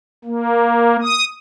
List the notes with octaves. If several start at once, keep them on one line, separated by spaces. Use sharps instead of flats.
A#3
D#6